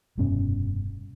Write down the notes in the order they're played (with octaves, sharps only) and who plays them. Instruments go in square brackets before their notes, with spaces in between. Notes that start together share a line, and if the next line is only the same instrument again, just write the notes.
[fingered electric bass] F1 G2 B2 C#4